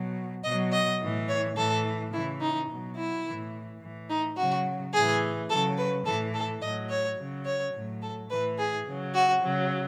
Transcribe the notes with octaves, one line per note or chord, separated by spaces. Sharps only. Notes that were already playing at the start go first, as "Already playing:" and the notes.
Already playing: B2 F#3
B2 F#3 D#5
D#5
A2 E3
C#5
A2 E3 A4
C#3 E3 E4
D#4
B2 F#3
E4
A2 E3
A2 E3
D#4
C#3 F#3 F#4
A2 E3 G#4
C#3 F#3 A4
B4
A2 E3 A4
A4
A2 F#3 D#5
C#5
C#3 F#3
C#5
A2 F#3
A4
A2 E3 B4
G#4
C#3 F#3
F#4
C#3 F#3